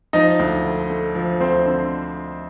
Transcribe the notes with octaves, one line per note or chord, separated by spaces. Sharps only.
F3 D#4 D#5
D2
D3
A3
F3
D2 C4 C5
D3